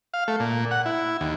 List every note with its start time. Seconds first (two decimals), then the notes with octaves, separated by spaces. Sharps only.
0.14 F5
0.28 A3
0.40 A#2
0.71 F#5
0.86 E4
1.21 D#2